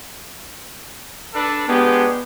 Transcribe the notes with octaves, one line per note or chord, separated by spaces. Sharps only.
D4 A4 B4
G#3 B3 D4 G4